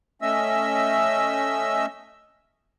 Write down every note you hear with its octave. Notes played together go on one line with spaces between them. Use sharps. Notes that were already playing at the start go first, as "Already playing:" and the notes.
A3 C#4 D#5 E5 E6